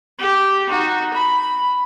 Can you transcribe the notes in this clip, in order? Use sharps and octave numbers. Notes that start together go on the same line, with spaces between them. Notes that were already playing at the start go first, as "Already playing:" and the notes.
G4
D#4 F#4
B5